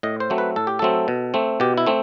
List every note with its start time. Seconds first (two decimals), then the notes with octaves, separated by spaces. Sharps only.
0.03 A2 D#5
0.20 C5
0.30 F#3 A3 C4
0.38 B4
0.56 A2 A4
0.67 G4
0.79 F#3 A3 C4 A4
1.08 B2
1.34 A3 C4
1.60 B2 G4
1.78 E4
1.87 A3 C4